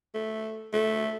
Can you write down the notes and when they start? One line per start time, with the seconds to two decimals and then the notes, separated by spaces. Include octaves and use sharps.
0.14 A3
0.73 A3